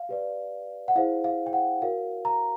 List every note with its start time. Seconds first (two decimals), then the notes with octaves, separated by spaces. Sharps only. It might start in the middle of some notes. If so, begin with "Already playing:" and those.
Already playing: F5
0.09 G4 B4 D5
0.88 F#5
0.96 E4 G#4 C5 F5
1.24 F5
1.46 G5
1.53 F#5
1.81 F#4 A#4 C#5 F5
2.25 A#5